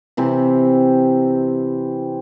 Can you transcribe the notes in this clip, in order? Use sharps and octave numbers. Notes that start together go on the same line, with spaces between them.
C3 E3 C4